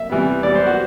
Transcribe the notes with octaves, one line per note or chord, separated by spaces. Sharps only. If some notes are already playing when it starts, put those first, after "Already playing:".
Already playing: E5
C3 E3 G3 B3
E3 G3 B3 D5
C5
F#4